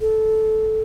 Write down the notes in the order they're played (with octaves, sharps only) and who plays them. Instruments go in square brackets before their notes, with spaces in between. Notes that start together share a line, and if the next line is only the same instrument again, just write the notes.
[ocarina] A4